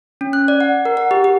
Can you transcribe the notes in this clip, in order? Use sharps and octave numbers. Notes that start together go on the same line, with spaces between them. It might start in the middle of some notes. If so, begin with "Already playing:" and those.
C#4
F#6
D5
F#5
A#4
F#5
G4
G4